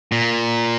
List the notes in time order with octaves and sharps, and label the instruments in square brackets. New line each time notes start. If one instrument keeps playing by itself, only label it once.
[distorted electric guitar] A#2